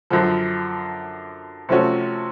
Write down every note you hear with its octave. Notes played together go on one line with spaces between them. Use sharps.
F#2 D3 F3
C3 F3 A3 C#4 F#4